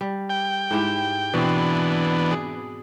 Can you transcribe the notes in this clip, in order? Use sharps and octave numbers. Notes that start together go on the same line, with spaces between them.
G3
G5
G#2 E4 G4
B2 E3 B3 C4 D4
G#4